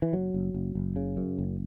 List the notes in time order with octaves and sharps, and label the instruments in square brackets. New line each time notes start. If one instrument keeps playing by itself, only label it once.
[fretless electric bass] E3
F#1 F#3
F#1
F#1
F#1
C#3
F#2
F#1